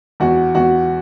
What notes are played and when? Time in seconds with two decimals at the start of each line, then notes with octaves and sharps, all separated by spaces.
0.20 E2 F#4
0.55 E2 F#4